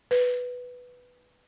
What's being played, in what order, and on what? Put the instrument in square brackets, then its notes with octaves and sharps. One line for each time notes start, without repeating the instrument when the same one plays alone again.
[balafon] B4